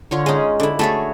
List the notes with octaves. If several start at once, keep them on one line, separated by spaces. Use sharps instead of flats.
D3 F4 C#5
G#3 C#4 D#4 G#4
D3 E4
A3 F#4 G#4 A4 C#5 E5